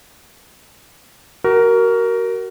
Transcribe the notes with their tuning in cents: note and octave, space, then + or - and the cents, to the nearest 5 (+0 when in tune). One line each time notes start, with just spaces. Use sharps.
F#4 +30 A#4 +0